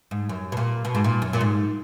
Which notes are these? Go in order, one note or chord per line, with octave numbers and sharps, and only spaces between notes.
G#2
F#2
B2
A#2
B2
G#2
A#2
F#2
A#2
G#2